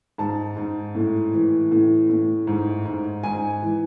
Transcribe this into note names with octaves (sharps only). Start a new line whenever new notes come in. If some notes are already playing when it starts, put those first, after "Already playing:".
G#2 A5
G#2
A2
E3
A2
A2
G#2
G#2
G#2 G#5
E3